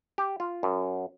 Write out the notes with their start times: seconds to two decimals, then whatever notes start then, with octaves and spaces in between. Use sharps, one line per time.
0.18 G4
0.40 F4
0.63 F#2